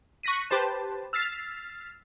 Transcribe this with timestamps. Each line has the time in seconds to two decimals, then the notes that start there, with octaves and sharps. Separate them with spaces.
0.23 C#6 F#6 A#6 B6 D#7
0.50 G4 B4 C5 A5
1.13 E6 F6 A6 B6 C7